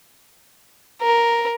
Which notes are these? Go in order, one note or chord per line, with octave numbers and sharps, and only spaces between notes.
A#4